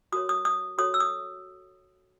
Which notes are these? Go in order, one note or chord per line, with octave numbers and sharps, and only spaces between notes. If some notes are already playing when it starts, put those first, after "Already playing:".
F#4 A#4 C#5 D#6
D#6
D#6
F#4 A4 C#5 D#6
E6
D#6